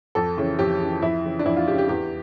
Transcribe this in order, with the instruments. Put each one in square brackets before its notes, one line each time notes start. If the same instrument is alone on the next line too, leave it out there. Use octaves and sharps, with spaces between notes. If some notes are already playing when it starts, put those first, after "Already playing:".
[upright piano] F2 A4
C#3 E3
F2 G4
C#3 E3
F2 E4
C#3 E3
D4
F2 E4
F4
E3 G4
C#3
G4
E2 G4